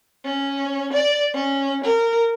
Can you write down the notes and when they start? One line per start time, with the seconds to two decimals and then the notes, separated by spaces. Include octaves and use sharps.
0.24 C#4
0.93 D5
1.33 C#4
1.83 A#4